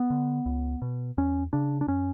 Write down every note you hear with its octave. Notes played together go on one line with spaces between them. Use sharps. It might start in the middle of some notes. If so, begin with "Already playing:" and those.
Already playing: B3
D3
C#2
B2
E2 C#4
C#3 D4
D4
F#2 C#4